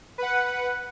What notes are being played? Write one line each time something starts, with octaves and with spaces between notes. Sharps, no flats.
B4 F#5